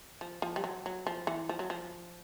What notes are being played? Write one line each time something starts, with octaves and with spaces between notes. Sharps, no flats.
F3
F3
G3
F#3
F#3
F3
E3
F3
F#3
F3